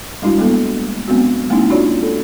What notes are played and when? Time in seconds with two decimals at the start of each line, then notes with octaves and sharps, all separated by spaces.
0.22 G3 G#3 D4 E4 F#4
0.38 G3 G#3 A#3 B3 A4
1.08 F#3 G#3 B3 C4 D4 F#4
1.50 G#3 A#3 C4 C#4 D#4 E4
1.70 D4 D#4 F4 F#4 C#5 D5
2.02 A4